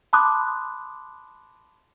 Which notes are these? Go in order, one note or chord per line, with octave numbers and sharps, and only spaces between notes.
A5 B5 C6 D6 D#6 F#6